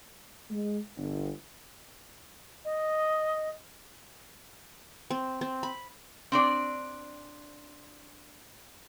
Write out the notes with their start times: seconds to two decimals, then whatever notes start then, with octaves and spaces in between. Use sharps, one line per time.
0.50 G#3
0.97 G1
2.65 D#5
5.11 C4
5.41 C4
5.63 B5
6.32 C4 D4 D5